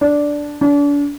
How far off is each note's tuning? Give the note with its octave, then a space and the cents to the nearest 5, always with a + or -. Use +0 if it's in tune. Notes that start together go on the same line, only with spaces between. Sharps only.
D4 -5
D4 -35